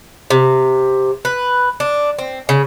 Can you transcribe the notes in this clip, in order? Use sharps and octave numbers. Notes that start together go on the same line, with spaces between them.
C3
B4
D4
C4
C#3